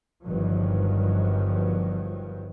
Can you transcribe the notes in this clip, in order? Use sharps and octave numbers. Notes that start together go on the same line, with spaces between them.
G1 G2 D#3 F3 F#3